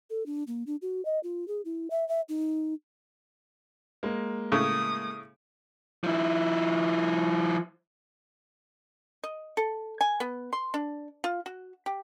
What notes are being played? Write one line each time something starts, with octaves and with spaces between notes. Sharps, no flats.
A4
D4
A#3
D4
F#4
D#5
F4
G#4
E4
E5
E5
D#4
G#3 A#3
A2 C#3 D#6
F3 E4
D#5
A4
G#5
B3
C6
D4
F4
F#4
G4